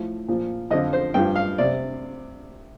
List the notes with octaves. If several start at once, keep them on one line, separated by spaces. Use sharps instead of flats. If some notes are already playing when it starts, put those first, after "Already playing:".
Already playing: A2 F3
A#2 F3
F2 D3 F3 D#5
C5
G2 F3 G5
F5
C3 D5